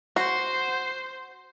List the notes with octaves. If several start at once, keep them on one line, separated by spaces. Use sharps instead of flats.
F#4 C5 C7